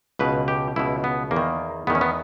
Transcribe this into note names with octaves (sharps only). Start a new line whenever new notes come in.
C#2 B2 B4
G4
C#2 B2 E4
B3
E2 A#3
D#3
E2 D#3 B3
C#4
B3